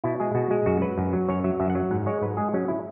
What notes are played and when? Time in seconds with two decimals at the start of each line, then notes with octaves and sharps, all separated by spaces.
0.04 B2 E4
0.20 G#3 G#4
0.35 B2 F#4
0.51 G#3
0.66 F#2 F#4
0.81 F#3 B4
0.98 F#2
1.13 F#3
1.28 F#2 C#5
1.44 F#3 E5
1.60 F#2 E5
1.70 F#5
1.75 F#3
1.91 G#2 F#5
2.06 G#3 C#5
2.22 G#2 B4
2.37 G#3 G#4
2.54 F#3 C#4
2.68 E4